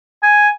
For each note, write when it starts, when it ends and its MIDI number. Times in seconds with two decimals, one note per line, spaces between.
0.23 0.49 80